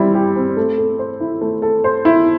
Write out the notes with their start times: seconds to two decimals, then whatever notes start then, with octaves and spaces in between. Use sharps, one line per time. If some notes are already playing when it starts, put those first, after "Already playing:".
Already playing: G3 C4 E4
0.15 G4
0.36 C4
0.57 A3
0.78 A4
0.99 C5
1.20 E4
1.42 A3
1.62 A4
1.84 C5
2.05 E4